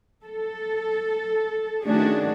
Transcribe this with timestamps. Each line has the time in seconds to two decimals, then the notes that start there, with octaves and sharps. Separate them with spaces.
0.24 A4
1.85 D#3 A3 C#4 D4 F#4 G#4